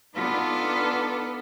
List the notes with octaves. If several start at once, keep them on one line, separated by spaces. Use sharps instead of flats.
B3 D4 D#4 F4 A4 B4